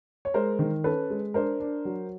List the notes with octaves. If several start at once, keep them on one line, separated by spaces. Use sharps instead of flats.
C#5
G#3 A#4 C5
D#3
C#4 A4 B4
G#3
D4 A#4 C5
D4
F#3